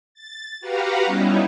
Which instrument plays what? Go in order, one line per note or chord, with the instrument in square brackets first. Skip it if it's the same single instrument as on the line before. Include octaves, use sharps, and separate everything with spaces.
[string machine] A6
F#4 G4 B4 F5 F#5 A#5
G3 B3 C#4 D#4 E4